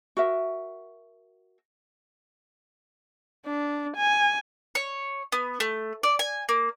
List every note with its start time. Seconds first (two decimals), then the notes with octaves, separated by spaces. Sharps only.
0.17 F#4 A#4 E5
3.46 D4
3.97 G#5
4.75 C#5
5.32 B3
5.60 A3
6.03 D5
6.19 G#5
6.49 A#3